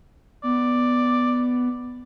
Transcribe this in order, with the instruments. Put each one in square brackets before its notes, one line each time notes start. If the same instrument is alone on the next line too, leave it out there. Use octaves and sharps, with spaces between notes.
[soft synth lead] B3 [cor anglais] D5